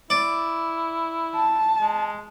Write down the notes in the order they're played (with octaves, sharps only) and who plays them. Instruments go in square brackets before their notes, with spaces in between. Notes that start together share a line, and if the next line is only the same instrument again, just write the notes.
[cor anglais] E4 [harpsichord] D5
[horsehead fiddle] A5
[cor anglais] G#3